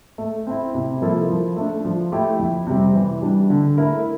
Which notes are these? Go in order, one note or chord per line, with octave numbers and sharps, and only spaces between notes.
A3
C4 E4
C3
F3 A#3 E4 A4
F3
A3 D4
F3
A3 E4 G4
F2
C3 G3 C4
E3
G3 D4
D3
A3 E4 A#4